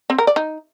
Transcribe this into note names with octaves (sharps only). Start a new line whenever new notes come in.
C4
A#4
D5
D#4